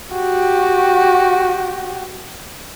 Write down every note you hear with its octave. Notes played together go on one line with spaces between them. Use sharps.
F#4 G4